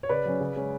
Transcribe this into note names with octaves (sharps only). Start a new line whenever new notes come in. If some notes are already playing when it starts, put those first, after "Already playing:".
C#5
C#3 B4 D5
F#3 C#4
C#3
G#3 C#4